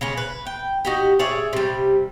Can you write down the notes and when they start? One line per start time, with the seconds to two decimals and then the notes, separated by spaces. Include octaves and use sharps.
0.01 C#3 G#3 C#4
0.17 B4
0.47 G5
0.85 D#4 F#4 G4
1.19 G#4 C#5 D5 E5
1.53 C3 G3